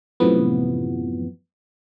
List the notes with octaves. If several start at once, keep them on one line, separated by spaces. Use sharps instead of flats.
F#2 A2 C3 E3 F3 B3